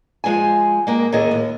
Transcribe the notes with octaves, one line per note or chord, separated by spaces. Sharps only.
F3 G#3 G#4 G#5
G#3 A#3 G5
D#2 A2 G#4 A#4 D#5
D#2